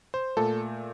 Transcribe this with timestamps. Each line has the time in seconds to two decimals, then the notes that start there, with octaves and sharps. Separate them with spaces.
0.14 C5
0.37 A#2 A3 A4